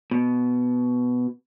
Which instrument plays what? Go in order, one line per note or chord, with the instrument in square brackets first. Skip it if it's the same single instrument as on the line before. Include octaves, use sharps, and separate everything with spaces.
[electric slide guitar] B2